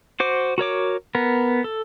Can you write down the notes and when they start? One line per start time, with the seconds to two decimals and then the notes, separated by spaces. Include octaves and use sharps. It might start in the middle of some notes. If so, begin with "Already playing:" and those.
0.20 F#4 C5 D6
0.58 F#4 A#4 C#5 D6
1.15 B3 A#4
1.64 A4